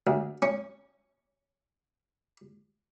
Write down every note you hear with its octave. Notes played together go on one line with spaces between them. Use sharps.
D2
C#4